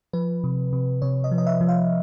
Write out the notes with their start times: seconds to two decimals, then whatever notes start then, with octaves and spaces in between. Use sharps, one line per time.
0.13 F3 B4
0.44 C3
0.73 C3
1.02 C3 C#5
1.24 D#5
1.31 F3
1.38 D#5
1.47 E5
1.61 F3
1.68 F5